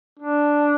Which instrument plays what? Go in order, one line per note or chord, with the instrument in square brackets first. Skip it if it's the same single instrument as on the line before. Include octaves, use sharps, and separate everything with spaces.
[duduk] D4